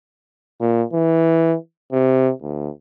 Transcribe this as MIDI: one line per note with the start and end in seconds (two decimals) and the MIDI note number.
0.61 0.83 46
0.93 1.56 52
1.92 2.32 48
2.42 2.69 38